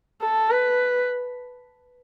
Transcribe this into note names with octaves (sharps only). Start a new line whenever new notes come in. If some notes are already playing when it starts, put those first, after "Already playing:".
A4
B4